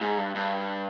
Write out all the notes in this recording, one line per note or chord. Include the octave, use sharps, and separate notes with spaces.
G#2
G2
G2